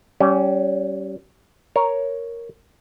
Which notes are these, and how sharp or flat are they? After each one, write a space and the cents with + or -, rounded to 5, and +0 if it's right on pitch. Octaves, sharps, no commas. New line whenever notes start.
G3 -25 C#4 +0
A#4 +0 C#5 +0